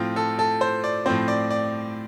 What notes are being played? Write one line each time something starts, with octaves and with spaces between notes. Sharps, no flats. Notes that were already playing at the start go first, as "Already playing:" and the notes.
Already playing: A2 F3 C4 F4
A4
A4
C5
D5
A2 F3 C4 C5
D5
D5